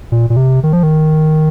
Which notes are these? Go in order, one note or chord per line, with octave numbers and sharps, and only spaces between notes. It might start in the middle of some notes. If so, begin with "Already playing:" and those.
A#2
A#2
C3
D#3
F3
D#3